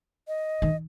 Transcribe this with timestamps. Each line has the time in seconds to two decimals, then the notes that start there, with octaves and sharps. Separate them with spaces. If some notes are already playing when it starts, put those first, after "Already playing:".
0.28 D#5
0.62 D#3